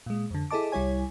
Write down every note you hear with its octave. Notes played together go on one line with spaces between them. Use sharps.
A#2 G#3
F2 D3
E4 G#4 A4 D#5 A5 D6
C2 G3 E4 C#5 G#5